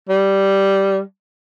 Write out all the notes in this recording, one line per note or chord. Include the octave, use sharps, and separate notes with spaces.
G3